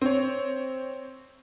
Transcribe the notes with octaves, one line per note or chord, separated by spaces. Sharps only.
C4 C#5